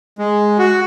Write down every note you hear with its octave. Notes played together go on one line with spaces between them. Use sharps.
G#3
F#4